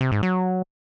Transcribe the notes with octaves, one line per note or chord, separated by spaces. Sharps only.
C3
G#2
F#3